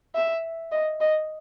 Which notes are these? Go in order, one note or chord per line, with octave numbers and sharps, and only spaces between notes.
E5
D#5
D#5